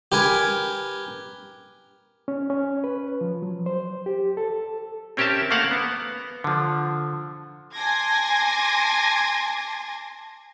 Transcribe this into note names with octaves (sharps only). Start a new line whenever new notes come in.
G4 A#4 B4 G#5
C#4
C#4
B4
F3
F#3
C5
G4
A4
C4 C#4 G4 A#4 E5 A5
A3 A#3 A#4 C5 F5 F#5
B3
D3 F3
G#5 A5 C6 D6 G#6 A#6